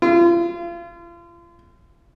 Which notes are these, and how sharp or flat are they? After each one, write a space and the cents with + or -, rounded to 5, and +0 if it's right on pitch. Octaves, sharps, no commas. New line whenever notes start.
F4 -35